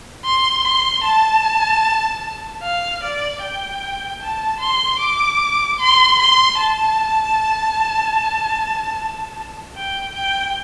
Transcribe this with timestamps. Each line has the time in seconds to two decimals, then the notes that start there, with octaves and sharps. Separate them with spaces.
0.25 C6
0.64 C6
1.04 A5
2.63 F5
3.03 D5
3.42 G5
4.21 A5
4.61 C6
5.00 D6
5.79 C6
6.19 C6
6.59 A5
9.76 G5
10.15 G5